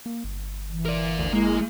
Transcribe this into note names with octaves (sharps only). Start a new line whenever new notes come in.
A#3
G1
E3
A#4 D5
D2
G#3 A#3 E4